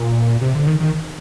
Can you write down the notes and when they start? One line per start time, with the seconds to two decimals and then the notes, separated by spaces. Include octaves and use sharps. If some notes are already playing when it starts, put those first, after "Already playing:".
Already playing: A#2
0.41 C3
0.54 D3
0.67 D#3
0.80 D#3